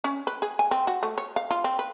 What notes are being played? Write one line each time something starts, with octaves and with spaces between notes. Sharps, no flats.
C#4
B4
G#4
G#5
C4
F#4
A3
C#5
F5
F4
C4
B4